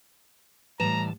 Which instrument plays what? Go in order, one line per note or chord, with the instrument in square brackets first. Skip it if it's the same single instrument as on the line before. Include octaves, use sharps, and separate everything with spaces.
[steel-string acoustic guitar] A2 G3 [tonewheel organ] E3 A5 [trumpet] A#5